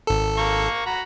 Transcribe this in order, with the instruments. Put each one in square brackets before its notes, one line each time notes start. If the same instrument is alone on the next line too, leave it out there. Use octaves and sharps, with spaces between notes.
[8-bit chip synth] G#1 A4
[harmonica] A#3 A#5 C#6
F#4 A#5 B5